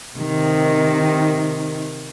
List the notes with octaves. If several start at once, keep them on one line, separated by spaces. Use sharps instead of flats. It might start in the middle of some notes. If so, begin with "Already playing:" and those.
C3 D#3